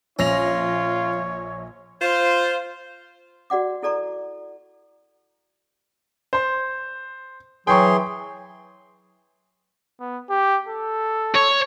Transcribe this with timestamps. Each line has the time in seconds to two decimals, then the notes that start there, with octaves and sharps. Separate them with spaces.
0.19 A#1 C#4 F4 C#5 A#6 F7
2.01 F4 C5
3.50 F#4 D5 F#5 D6
3.83 E4 A4 D5 A#5 C#6
6.33 C5 C6
7.67 E3 F#3 G#4 G5 C6 C#6
10.00 B3
10.30 G4
10.68 A4
11.35 C#5